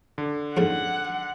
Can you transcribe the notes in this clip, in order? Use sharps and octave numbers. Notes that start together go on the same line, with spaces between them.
D3
F2 G#2 C#3 F#5